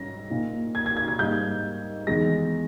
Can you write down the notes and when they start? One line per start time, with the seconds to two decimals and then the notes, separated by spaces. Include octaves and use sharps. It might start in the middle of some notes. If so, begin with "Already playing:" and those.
Already playing: G#2 G3 C#4 A#6
0.30 A#2 A#3 D#4
0.75 G#6
0.86 G#6
0.97 G#6
1.08 G#6
1.19 G#2 G3 A#3 D#4 G6
2.07 E2 D#3 G#3 A#6